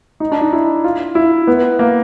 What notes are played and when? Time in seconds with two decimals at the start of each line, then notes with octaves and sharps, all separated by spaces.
0.20 D#4
0.32 D4
0.41 D#4
0.53 E4
0.84 F4
1.15 E4
1.47 B3
1.79 A#3